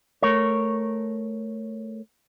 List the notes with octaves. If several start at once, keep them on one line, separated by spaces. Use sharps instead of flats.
A3 A#4 C#5